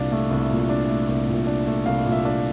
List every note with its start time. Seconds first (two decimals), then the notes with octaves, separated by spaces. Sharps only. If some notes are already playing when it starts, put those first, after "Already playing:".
Already playing: C2 A#2 D4 F5
0.12 A3
0.31 C2
0.51 A#2
0.69 D4
0.90 A3
1.09 C2
1.28 A#2
1.47 D4
1.67 A3
1.86 C2 F5
2.06 A#2
2.12 E5
2.25 D4